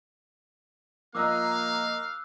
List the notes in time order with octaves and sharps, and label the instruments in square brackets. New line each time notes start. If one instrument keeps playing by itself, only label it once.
[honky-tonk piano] F3 D#5 A#5 [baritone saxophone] A#3 [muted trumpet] F5 [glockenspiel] D6 E6 F#6